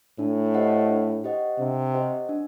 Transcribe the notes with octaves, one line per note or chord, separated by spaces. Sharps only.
A2 D4
G4 C5 D#5 F#5
D4
G4 C5 D#5 F#5
C3 D4
G4 C5 D#5 F#5
D4